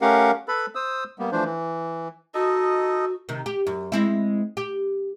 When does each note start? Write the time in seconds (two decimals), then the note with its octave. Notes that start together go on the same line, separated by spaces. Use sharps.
0.01 A3 C#4 G4 A#4 F5 F#5
0.48 A4 B4 B5
0.75 C5 D#6 E6
1.19 G3 A#3 B3
1.32 E3 F3 A3 D4 C5
1.44 E3
2.34 D#4 F#4 A4 D#5
3.29 C3 D#3
3.46 G4
3.67 F#2
3.92 G#3 C4 E4
4.57 G4